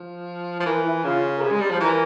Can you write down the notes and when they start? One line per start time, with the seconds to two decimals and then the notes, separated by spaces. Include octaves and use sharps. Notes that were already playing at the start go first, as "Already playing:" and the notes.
Already playing: F3
0.60 F3
0.65 E3 A#4
0.84 E4
1.04 C#3 F4
1.37 A#4
1.42 C3 G#4
1.51 G#3
1.60 G3
1.70 F3 C5
1.80 E3 A#4